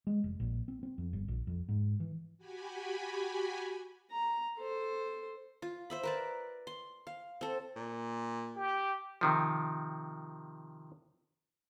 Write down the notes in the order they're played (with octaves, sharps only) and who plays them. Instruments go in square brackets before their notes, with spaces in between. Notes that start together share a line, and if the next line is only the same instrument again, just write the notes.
[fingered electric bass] G#3
F1
A#1
C4
C4
F2
G1
A#1
F2
G#2
E3
[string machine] F#4 G4 G#5 B5
[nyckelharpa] A#5
A4 C5
[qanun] F4
C5 E5 B5
A#4 B4 D5
C6
F5
C4 A4
[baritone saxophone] A#2
[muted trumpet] G4
[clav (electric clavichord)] C3 D#3 F3